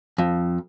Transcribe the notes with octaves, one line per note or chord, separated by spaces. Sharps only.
F2